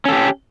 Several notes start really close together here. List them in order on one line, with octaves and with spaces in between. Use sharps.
C#4 A4 G4